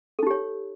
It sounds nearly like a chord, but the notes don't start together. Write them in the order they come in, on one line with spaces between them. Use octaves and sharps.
A4 D#4 G4 C#5